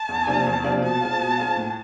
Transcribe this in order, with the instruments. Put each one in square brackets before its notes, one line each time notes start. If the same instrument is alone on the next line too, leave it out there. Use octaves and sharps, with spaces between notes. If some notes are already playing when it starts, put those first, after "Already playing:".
Already playing: [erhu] A5
[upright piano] E2
C3 F3 A#3 D4
E2
C3 F3 A#3 D4
[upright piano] B2 [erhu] A5
[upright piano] G#3 C4 F4
B2
G#3 C4 F4
A2